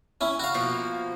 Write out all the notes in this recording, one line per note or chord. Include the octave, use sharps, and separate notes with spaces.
C#4 E4
F#4 F5
B2 F3 A#3